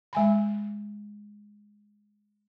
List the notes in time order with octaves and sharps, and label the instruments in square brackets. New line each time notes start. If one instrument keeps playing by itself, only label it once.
[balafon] G#3 G#5 B5